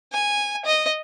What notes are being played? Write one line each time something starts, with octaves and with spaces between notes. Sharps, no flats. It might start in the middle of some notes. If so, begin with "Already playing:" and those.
G#5
D#5